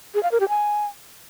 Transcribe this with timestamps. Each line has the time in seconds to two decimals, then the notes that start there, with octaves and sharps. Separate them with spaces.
0.14 G#4
0.23 F5
0.32 A#4
0.40 G4
0.49 G#5